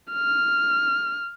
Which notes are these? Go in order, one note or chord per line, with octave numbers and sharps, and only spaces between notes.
F6